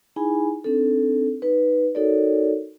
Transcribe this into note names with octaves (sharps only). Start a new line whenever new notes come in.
D#4 E4 G#4 G#5 B5
C4 D4 D#4 A4
D#4 B4
D#4 F#4 A4 A#4 C#5 D5